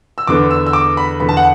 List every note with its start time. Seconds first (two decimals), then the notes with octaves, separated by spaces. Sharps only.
0.18 E6
0.27 E2 D3 B3 D6
0.51 E6
0.66 E6
0.73 D6
0.97 B5
1.19 E2 D3 B3 B5
1.29 A5
1.37 F#5